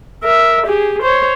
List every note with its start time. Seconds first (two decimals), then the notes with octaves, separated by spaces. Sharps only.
0.23 A#4 E5
0.66 G4 G#4
1.03 C5 C#5